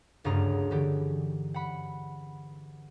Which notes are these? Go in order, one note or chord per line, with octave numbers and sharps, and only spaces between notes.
F#1 D2 G2 F4 G#4 A#5
D3 E3 G4
F#5 B5